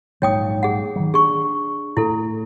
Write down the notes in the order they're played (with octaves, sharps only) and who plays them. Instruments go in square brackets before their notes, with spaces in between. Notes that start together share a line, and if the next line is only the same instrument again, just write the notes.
[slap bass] A#1 G#2 F#3 [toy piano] C#5 G5 D#6
[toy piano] G#4 F#5
[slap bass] D#3 F#3
[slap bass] D4 [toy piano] G#4 C#6
[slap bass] A2 [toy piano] E4 A4